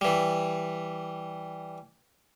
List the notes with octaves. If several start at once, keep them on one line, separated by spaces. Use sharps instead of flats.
E3 G3